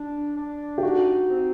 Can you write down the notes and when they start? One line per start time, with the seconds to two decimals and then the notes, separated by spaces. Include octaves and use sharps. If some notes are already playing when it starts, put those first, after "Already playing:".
Already playing: D4
0.36 D4
0.78 G4
0.83 D#4 F#4
1.29 C4